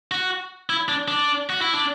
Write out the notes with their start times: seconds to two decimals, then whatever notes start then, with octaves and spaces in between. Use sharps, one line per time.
0.11 F#4
0.70 E4
0.88 D4
1.08 D4
1.49 F#4
1.61 E4
1.73 D4